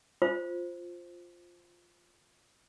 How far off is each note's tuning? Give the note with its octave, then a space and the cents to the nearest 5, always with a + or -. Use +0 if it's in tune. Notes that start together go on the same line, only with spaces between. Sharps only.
F4 +0 C5 +0